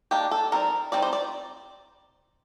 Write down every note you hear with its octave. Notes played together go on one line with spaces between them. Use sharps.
D#3 A#3 D4 G4
A4
G3 C4 D#4 A#4
G3 C4 D#4 D5
C5
D5